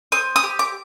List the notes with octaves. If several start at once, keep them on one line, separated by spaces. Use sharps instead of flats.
C4 D#6
D#6
G4
D6